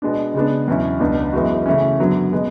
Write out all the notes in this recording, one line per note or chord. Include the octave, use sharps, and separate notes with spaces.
B2 G#3 B3 D4
C#3 G#3 B3 D4
E2 B2 F#3 C#4 E4
C#2 B2 F#3 B3 D4
F#2 E3 G#3 B3 F#4
C#3 E3 A3 C#4
F#2 D3 F#3 B3
B2 G#3 B3